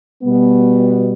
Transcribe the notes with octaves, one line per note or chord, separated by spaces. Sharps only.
B2 G3 B3